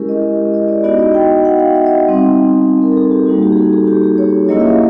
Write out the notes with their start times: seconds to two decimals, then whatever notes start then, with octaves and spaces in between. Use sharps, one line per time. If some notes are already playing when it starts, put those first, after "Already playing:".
Already playing: G#3 C#4 E4 G4 G#4 A#4
0.09 D#5
0.54 D#5
0.69 D5
0.84 B3 D#4 F#4 D#5
0.99 D#5
1.14 G5
1.45 F#5
1.60 F5
1.75 E5
1.86 D#5
2.06 G3 C4 D#4
2.82 A#4
2.92 A4
2.97 G#4
3.12 G4
3.27 G3 A#3 D#4 F#4
3.42 G4
3.52 G#4
3.57 A4
3.73 G#4
3.88 G4
4.03 G#4
4.18 C#5
4.49 F#3 A#3 C#4 E4 D#5
4.60 E5
4.69 F5